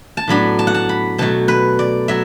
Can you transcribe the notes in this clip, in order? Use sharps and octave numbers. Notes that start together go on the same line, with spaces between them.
A5
A2 F#3 B3 D4 B5
A5
F#5
A5
B5
B2 F#3 A3 A5
B4
D5
F#3 E5